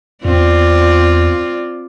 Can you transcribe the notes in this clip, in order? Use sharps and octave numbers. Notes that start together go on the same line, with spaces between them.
E2 C4 F4 D5